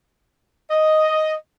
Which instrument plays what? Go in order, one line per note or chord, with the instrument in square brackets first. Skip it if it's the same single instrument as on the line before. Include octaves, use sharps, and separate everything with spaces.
[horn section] D#5